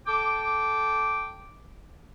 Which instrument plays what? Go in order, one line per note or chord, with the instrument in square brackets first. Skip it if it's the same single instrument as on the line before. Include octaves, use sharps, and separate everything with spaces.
[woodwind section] A4 G5 D6